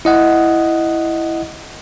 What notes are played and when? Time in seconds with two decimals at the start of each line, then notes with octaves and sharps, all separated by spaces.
0.05 E4 D#5 F#5